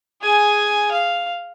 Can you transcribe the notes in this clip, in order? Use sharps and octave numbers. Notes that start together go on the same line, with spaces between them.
G#4 G#5
F5